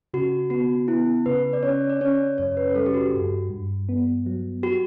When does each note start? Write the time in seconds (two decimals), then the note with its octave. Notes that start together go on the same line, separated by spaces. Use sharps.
0.14 C#3 F#4
0.50 B3 F#4
0.88 B3 E4
1.26 C#3 B4
1.53 D5
1.63 C#4 C#5
1.90 D5
2.01 C#4 C#5
2.38 F#2 C#5
2.57 B4
2.70 B4
2.75 G3 A4
2.86 G4
2.94 F#4
3.14 G2
3.50 G2
3.89 B3
4.26 F#3
4.63 F#4 G4